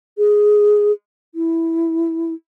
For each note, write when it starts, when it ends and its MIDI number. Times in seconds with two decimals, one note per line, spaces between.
0.18 0.92 68
1.35 2.33 64